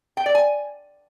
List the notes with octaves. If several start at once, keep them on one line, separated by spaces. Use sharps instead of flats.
G5
D5
G#5